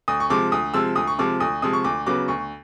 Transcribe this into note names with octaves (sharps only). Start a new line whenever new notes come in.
D2 D#6
C#6
C3 F3 G#3 D6
D2 D#6
C3 F3 G#3 E6
D2 D#6
C#6
C3 F3 G#3 D6
D2 D#6
C3 F3 G#3 D#6
C#6
D2 D6
C#3 F#3 B3 D6
D2 C#6